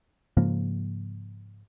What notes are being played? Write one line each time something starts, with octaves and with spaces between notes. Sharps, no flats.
G#2 C#3 F3 A#3